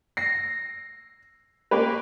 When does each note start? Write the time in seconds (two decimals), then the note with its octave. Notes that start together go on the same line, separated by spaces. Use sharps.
0.17 A#6 C7
1.71 A#3 C#4 G4 B4